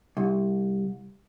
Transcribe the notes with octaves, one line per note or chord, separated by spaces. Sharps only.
C2